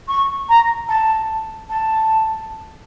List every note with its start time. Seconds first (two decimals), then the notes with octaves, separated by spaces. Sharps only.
0.08 C#6
0.49 A#5
0.89 A5
1.69 A5